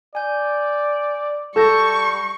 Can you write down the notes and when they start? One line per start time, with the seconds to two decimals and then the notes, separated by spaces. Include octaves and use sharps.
0.15 D5 G#5 G6
1.56 G3 A4 A5 C#6 G6 A#6